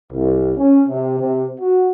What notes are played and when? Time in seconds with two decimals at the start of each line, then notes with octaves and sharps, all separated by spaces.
0.12 C2
0.56 C#4
0.87 C3
1.20 C3
1.61 F#4